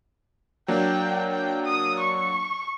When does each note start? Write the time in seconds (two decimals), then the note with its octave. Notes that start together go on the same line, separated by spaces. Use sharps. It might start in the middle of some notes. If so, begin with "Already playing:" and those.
0.68 F#3 A#3 D4 G5
1.30 G5
1.65 D#6
1.99 C#6